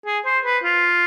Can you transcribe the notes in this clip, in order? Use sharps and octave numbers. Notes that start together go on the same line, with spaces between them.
G#4
C5
B4
F4